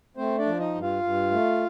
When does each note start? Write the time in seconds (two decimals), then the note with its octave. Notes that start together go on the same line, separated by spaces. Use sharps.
0.17 A3 C4 C5
0.38 D4 D5
0.46 F3
0.59 D#4 D#5
0.75 G2
0.81 F4 F5
1.03 G2
1.31 A3